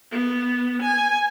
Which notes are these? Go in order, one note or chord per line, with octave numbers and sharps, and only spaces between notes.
B3
G#5